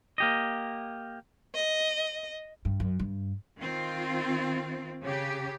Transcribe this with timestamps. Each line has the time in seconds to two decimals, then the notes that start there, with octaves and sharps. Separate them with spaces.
0.18 A#3 G4 D#5
1.55 D#5
2.65 G2
2.80 F#2
2.99 G2
3.59 D#3 C4 F4
5.02 C#3 G4